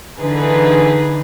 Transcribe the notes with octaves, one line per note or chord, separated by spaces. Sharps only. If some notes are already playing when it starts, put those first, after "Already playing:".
D3 E3 D#4 G#4 B4